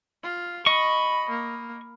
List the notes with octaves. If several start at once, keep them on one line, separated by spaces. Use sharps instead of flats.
F4
D#5 B5 C#6
A#3